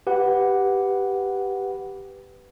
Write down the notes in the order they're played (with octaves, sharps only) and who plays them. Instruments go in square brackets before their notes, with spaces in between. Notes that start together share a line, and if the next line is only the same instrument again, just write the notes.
[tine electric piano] G4 B4 F#5